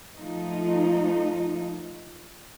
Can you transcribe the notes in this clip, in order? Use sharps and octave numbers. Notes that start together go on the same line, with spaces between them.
F3 A3 D#4